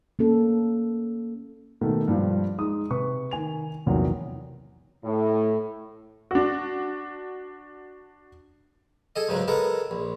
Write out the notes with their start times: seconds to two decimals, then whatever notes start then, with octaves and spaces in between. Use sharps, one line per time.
0.19 A#3 C#4 A4
1.81 B2 D#3 A3
2.08 G2 F3
2.58 G#3 D#4 D#6
2.90 C3 B4 C#6
3.31 D#3 G#5 F7
3.86 A#1 E2 C3 D#3 F#3
5.04 A2
6.31 D4 F#4
9.16 G#4 A4 D#5
9.29 C#2 G#2 C#3 F#3 G#3
9.48 G#3 B3 A4 A#4
9.91 A#1